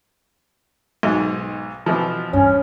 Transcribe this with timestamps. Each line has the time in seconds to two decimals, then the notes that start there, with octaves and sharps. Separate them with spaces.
1.03 B1 G#2
1.86 B2 E3 F3
2.33 E2 G2 C#4